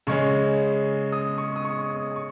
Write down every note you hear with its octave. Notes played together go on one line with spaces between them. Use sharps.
C#3 G#3 C#4 C#6
D#6
C#6
D#6
C#6
D#6
C#6